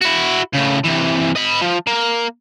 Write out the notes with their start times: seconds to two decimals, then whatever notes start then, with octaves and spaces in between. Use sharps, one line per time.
0.02 E4 F#4
0.53 A2 C#3
0.84 C3 E3
1.36 D#5 B5
1.62 F3
1.87 A#3